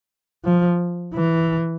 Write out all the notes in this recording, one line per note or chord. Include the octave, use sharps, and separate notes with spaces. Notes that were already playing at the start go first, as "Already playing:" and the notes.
F3
E3